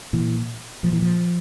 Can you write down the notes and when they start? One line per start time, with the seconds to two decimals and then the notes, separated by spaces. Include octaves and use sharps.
0.13 A#2 E3
0.83 A#2 F3
0.93 E3
1.02 F3